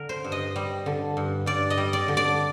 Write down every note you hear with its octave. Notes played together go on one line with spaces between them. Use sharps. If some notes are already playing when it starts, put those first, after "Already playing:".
Already playing: D3 A#4
C5
G2
D#5
G3
D3
G2
G2 D5
D#5
G3
D5
D3
D5